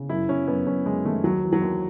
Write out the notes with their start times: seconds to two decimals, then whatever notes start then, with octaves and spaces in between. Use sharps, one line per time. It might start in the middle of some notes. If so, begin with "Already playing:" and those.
Already playing: C#3
0.09 F#2 E4
0.29 F#2 C#4
0.47 F#2 B3
0.67 F#2 C#4
0.86 F#2 G#3
1.05 D#3 A3
1.23 D#2 F#3
1.43 E3
1.53 F#3
1.61 D#2